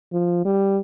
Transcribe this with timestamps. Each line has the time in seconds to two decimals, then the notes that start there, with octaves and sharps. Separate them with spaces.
0.13 F3
0.45 G3